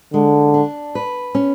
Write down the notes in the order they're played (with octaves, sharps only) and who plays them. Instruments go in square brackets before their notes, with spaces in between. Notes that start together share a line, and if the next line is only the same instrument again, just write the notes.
[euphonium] D3 [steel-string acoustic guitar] G#3
[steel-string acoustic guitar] D4
B4
C#4